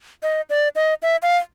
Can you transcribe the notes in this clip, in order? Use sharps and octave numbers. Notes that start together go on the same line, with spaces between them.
D#5
D5
D#5
E5
F5